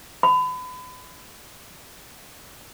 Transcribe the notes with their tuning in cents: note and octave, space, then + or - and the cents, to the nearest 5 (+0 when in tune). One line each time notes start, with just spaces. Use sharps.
B5 +35